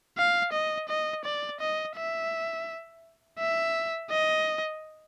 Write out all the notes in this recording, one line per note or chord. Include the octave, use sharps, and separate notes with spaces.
F5
D#5
D#5
D5
D#5
E5
E5
D#5